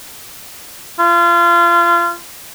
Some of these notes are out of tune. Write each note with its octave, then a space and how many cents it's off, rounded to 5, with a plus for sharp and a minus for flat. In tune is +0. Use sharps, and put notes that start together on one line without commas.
F4 -30